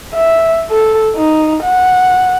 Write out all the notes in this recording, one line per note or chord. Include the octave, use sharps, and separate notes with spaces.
E5
A4
D#4
F#5